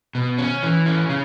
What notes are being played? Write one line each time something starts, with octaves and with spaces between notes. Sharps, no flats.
B2
C#4
E3
C#4
C#3